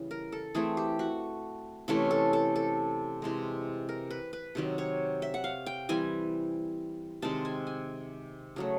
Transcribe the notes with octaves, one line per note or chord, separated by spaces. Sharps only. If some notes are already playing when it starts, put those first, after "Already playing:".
Already playing: C#3 E3 G3
A#4
A4
E3 A3 C4 G#4
G4
F#4
C3 E3 A3 C#4
A4
A4
A4
C3 E3 G#3
A#4
B4
B4
C3 D#3 F#3
C#5
E5
F#5
F5
G5
E3 G3 C4 G#5
C3 D#3 G#3 C4 A5
G#5
G#5
C#3 F#3 A3